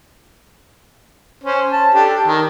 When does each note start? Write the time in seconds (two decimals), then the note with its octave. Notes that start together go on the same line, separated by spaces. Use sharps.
1.44 C#4 C5
1.72 A5
1.94 D4 G4 A4
2.28 D#3